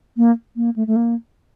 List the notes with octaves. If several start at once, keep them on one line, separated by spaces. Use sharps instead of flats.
A#3
A#3
A3
A3
A#3